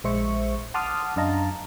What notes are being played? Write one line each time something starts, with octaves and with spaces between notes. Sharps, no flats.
A#1 G#3 C5 E5 C#6 C#7
F#5 A5 C6 D6 D#6 F6
F#2 D4 D#5 F5 A5 A#5